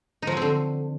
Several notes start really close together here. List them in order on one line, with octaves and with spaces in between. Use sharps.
D#4 F3 F#3 C4 D3